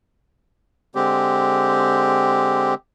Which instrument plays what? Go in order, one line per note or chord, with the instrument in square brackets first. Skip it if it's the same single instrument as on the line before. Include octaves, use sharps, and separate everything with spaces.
[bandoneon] D3 G#3 C4 G4